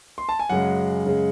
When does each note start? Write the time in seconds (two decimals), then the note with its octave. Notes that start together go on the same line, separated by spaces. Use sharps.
0.18 C6
0.29 A5
0.39 G#5
0.49 F#2 C#3 G#3 F#5
1.05 F#2 C#3 G#3